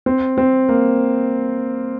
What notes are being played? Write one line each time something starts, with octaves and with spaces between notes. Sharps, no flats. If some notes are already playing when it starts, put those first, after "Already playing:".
C4
C4
A#3